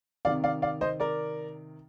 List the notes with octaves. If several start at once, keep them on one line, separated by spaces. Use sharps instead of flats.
C3 D#3 D5 F5
D5 F5
D5 F5
C5 D#5
A#4 D5